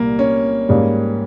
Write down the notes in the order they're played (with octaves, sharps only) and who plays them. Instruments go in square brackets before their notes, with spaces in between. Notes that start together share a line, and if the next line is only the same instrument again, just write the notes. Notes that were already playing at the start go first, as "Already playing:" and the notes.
Already playing: [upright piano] C2 A#2 G3 [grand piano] A#3
[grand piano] C#4
[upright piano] G#2 G3 A#3 C#4